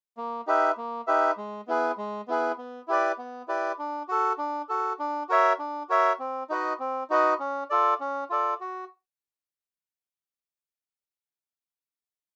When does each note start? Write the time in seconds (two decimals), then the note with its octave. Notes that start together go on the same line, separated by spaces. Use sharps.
0.17 A#3
0.47 D#4 G4 B4 E5
0.77 A#3
1.07 D#4 G4 B4 E5
1.37 G#3
1.67 B3 E4 G#4 B4
1.97 G#3
2.28 B3 E4 G#4 B4
2.58 B3
2.88 E4 G4 B4 D5
3.18 B3
3.48 E4 G4 B4 D5
3.79 D4
4.08 F#4 A4
4.38 D4
4.69 F#4 A4
4.99 D4
5.29 F#4 A#4 C#5 E5
5.59 D4
5.89 F#4 A#4 C#5 E5
6.19 C4
6.49 D#4 F#4 B4 D#5
6.79 C4
7.10 D#4 F#4 B4 D#5
7.40 C#4
7.70 F4 A4 D5
8.00 C#4
8.30 F4 A4 D5
8.61 F#4